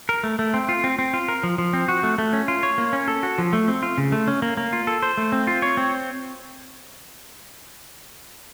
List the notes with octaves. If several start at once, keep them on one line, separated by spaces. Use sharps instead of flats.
A#4
A3
A3
C4
F4
C4
C4
F4
A#4
F3
F3
C4
F#4
A3
A3
C#4
F4
C#5
A#3
C#4
A4
F#4
F3
A3
C4
F4
C#3
A3
C#4
A#3
A#3
F4
A4
C5
A3
C4
F4
C#5
C4